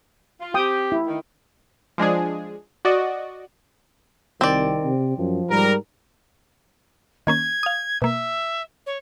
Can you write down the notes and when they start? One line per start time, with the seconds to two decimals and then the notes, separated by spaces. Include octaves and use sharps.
0.40 F4
0.54 C4 G4 G5 D#6
0.92 E4
1.06 D#3
1.98 F3 G#3 D4 G#4
2.85 F#4 D5 D#5
4.41 C2 D#3 C4 D5
4.84 C3
5.18 F#2 F3
5.50 G#2 G3 A#4
7.27 D#3 A#3 C#4 G#6
7.63 F5 D#6
8.02 B2 A#3 E5
8.86 C#5